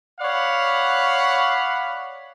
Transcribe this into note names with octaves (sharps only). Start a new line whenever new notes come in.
C#5 D5 F5 F#5 B5